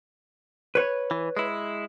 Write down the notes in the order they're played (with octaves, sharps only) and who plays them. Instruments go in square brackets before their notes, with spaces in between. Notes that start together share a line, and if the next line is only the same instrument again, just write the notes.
[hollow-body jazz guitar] B4 C#5
[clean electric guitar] E3
G#3 E4